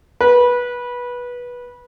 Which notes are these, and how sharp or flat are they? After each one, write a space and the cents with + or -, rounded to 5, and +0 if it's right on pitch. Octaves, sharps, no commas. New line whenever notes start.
B4 -15